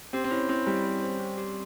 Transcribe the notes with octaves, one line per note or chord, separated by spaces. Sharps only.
C4 G4
C4
C#4 E4
C4 E4
G3 E4
C5
C5
C4
G4